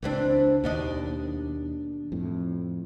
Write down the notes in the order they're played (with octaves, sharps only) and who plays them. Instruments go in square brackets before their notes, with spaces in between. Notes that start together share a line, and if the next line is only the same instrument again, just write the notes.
[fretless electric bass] C#2 [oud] E3 C4 D4
[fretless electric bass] D#2 [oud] B2 D4 D#5
[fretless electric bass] F2 A2